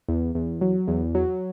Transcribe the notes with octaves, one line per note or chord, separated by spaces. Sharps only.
E2
E2
F#3
E2
F#3